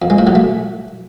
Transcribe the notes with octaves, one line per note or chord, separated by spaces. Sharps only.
F2
G#3
A2
F#3
A3